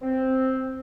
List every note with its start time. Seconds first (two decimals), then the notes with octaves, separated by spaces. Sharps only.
0.02 C4